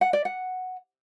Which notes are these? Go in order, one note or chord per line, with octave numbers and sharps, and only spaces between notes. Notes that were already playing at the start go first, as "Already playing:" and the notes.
F#5
D5
F#5